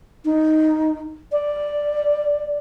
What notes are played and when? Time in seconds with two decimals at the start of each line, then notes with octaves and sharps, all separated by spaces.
0.25 D#4
1.32 D5